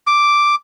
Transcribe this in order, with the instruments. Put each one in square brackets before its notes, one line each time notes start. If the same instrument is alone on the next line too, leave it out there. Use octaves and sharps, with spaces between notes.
[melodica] D6